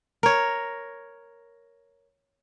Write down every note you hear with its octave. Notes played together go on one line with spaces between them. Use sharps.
A#4 C#5